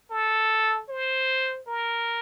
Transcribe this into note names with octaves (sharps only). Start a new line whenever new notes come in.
A4
C5
A#4